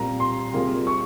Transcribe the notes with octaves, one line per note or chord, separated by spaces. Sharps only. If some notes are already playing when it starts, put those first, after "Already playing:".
Already playing: A#2 G3 C4 A#5
C6
C3 G3 A#3 F4 G#4
C#6